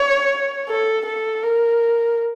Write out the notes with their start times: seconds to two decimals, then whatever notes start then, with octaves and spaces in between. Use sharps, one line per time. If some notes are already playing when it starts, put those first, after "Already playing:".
Already playing: C#5
0.69 A4
1.06 A4
1.43 A#4